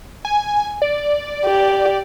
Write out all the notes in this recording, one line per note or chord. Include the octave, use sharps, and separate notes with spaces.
G#5
D5
G4